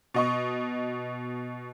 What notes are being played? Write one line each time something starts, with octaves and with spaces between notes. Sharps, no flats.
B2 D#5 C#6